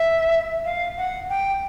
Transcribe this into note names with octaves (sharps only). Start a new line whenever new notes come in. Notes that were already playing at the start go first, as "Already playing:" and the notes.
Already playing: E5
F5
F#5
G5